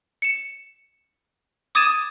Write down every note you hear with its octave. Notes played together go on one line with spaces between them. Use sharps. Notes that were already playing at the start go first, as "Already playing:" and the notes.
C#7 E7
D6 D#6 G#6 A6 D#7 E7